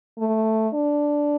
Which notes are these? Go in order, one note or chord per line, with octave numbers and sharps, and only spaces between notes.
A3
D4